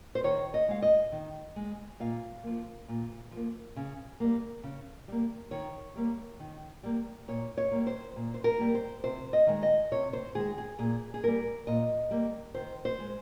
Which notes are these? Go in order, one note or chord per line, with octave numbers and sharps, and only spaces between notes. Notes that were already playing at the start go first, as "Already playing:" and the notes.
C5
D#3 C#5
D#5
G#3 F5
D#5
D#3
G#3
A#2 F5
F3 A#3
A#2
F3 A#3
C#3
G3 A#3
C#3
G3 A#3
D#3 C#5
G3 A#3
D#3
G3 A#3
A#2 C#5
C#5
G3 A#3
C5
A#2
C5
A#4
G3 A#3
C5
C3 C5
D#5
D#3 G#3
D#5
C3 C#5
C5
D#3 G#3 G#4
G#4
A#2 G#4
G#4
G3 A#3 A#4
A#2 D#5
G3 A#3
D#3 C5
C5
G#3